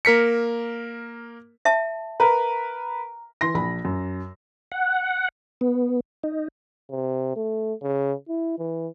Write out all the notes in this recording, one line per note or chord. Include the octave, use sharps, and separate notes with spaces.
A#3 A#4 B6 C#7
E5 A5
A#4 B4 A#5
E3 C6 A#6
A#1 B5
F#2
F#5
B3
D#4
C3
A3
C#3
E4
E3